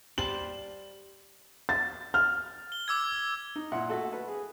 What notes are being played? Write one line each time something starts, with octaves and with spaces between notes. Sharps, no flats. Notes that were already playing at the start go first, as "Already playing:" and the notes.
G3 C5 A5 F#7
A6
F6
G7
D6 E6 G#6
D#4
A#2 E4 F#5
A3 F#4 A4
A4 B4
G#4